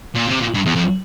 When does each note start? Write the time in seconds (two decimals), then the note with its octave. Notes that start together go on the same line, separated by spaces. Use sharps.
0.15 A#2
0.27 C3
0.40 A#2
0.54 G2
0.66 E2
0.75 F2